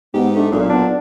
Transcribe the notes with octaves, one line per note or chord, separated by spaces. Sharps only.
G#2 B3 G4
A3 D4
B1 A#2
B3 D4